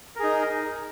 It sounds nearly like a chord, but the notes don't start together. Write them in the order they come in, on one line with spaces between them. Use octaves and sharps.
A#4 G#4 D#4